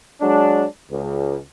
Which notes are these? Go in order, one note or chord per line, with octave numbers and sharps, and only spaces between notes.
F#3 G#3 D4
C#2